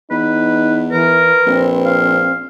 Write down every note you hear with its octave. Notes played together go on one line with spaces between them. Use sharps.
E2 D#4 B4
E3 A#4 B4
A#1 C4
F5